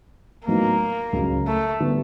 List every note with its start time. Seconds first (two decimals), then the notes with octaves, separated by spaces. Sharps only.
0.47 A2 F#3 A#3 B3 D#4
1.13 C#2 C#3 F#3
1.47 A3
1.80 D3 G3 B3